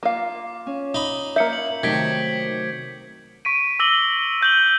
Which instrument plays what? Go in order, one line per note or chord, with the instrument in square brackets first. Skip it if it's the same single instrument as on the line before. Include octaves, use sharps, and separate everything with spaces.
[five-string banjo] A#3 F5 [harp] F4 [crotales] D6
[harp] C#4
[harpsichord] D#4 B5
[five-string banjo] A#3 E5 [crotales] G6 C#7
[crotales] G6 F#7
[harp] C3 F#3 A3 [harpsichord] D#3 [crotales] G#6 B6 D7
[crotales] C#6 B6 D7 D#7
D6 E6 A#6 F#7 G7
E6 G6 D#7 F#7 G7